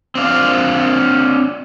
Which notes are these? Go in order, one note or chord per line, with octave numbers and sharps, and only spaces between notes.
C4 D4 F4 F5